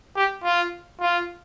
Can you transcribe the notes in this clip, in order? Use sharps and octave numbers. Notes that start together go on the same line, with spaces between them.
G4
F4
F4